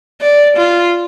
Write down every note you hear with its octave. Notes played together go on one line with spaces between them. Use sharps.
D5
F4